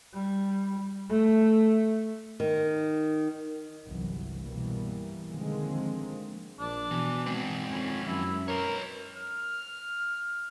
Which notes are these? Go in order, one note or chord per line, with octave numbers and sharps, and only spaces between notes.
G3
A3
D#3
G1 C2 E3 F#3
B2 E3 G3 A#3
D3 D#3 F3 G#3 A#3 C4
A#1 D4
B2 E3
G#3 C4
F2 C#4
F#2 E4
A#4 B4 C#5
F6